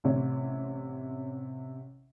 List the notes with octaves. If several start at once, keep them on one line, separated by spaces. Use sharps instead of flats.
A1 C3 C#5